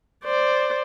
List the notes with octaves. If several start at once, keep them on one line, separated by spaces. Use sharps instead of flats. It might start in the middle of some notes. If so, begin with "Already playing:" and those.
C5 D5